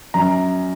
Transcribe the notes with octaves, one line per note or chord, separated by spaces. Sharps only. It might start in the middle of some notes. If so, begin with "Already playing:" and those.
F#2 A#5